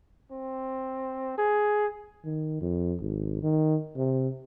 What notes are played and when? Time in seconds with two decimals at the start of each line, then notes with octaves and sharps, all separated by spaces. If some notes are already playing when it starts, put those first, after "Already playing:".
0.32 C4
1.38 G#4
2.24 D#3
2.61 F2
3.01 G#1
3.43 D#3
3.96 C3